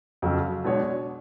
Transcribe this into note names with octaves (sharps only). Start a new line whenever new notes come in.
F2 C#3 F#3
B2 G#3 D4 G#4 C#5